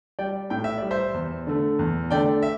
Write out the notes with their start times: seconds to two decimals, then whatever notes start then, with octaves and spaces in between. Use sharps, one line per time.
0.19 G3 D5 G5
0.50 A2 G5
0.64 E5
0.78 G3 D5
0.91 C5 E5
1.14 E2
1.47 D3 A3
1.79 E2
2.11 D3 A3 D5 G5
2.43 E5